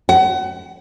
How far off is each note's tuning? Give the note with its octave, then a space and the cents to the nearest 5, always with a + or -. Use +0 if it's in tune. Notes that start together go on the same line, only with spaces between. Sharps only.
F#5 +30